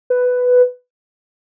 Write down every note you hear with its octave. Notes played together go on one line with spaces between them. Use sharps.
B4